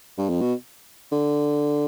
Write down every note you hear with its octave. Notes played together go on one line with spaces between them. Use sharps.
G2
F2
B2
D3